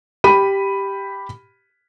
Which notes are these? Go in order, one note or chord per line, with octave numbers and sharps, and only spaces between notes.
G4 B5 D#7